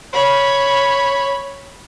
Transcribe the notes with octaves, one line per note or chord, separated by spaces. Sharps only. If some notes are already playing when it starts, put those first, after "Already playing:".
C#5 B5